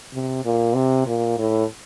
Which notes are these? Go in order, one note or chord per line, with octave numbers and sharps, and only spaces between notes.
C3
A#2
C3
A#2
A2